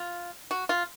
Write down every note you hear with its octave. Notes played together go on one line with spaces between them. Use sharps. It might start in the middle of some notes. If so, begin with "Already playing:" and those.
Already playing: F4
F#4
F4